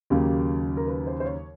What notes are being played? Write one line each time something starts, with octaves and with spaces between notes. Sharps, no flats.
D#2 C#3 F#3 A#3 G4
A#4
B4
C5
C5
C#5